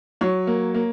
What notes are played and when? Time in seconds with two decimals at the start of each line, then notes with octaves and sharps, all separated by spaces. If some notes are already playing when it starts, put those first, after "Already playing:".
0.21 F#3 C#5
0.47 A#3
0.74 A#3